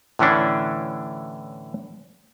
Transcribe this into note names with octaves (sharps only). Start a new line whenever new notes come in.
A2 D3 E3 C#4 D4